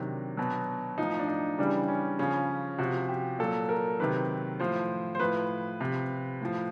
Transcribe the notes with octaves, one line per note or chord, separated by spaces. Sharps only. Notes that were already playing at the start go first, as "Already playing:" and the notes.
Already playing: C3 D#3 F#3 D4
B2 F#3
A2 F3 D#4
D4
D#4
C#3 E3 G3 D4
C#4
C#3 F3 C#4
C3 F3 F#4
G4
A#2 F#3 A4
A#4
C3 D#3 F#3 B4
A2 F3 C5
C5
A2 F3 B4
C3 F3
A2 F3